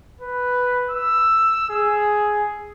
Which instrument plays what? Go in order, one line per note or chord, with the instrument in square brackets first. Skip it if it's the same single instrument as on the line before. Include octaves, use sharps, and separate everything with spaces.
[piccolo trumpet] B4
E6
G#4